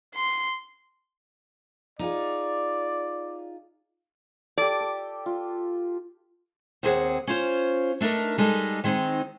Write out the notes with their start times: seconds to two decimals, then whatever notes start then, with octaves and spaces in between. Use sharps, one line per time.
0.15 C6
1.99 D#4 F4 G#4 D5
4.58 G4 A4 D5
4.80 A4
5.26 F4
6.83 D#2 C4 G#4 F#5
7.27 C#4 F4 C5
8.01 A3 D4 D#4 A#4 B4
8.38 G3 G#3 D#4 A4
8.84 D#3 G#3 C4 C#4 D#4